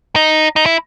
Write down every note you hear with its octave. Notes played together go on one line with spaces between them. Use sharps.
D#4
D#4
E4